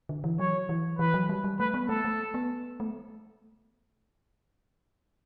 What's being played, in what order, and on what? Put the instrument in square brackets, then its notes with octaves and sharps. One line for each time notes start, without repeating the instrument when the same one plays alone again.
[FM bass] D3
E3
[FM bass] F#3 [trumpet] C#5
[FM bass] E3
[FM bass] E3 [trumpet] B4
[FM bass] F#3
G3
G3
[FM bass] A3 [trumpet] B4
[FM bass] B3
[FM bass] A3 [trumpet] A4
[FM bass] A3
B3
A3